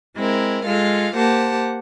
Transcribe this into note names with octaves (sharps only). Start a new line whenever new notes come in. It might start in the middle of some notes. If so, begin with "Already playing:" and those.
G#3 C4 E4 A#4
G#3 F4 A4 F5
A#3 G4 C5 F#5 A5